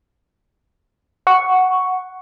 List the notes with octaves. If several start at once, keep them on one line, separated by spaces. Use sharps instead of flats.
F#5 C#6